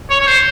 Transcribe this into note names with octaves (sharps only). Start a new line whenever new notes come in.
C#5
C#5
C5